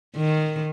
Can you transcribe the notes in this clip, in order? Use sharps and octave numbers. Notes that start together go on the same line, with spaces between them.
D#3